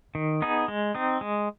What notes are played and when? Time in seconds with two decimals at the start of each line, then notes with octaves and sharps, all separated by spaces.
0.15 D#3
0.42 B3 D#4 G#4
0.68 G#3
0.95 C4 D#4
1.21 G#3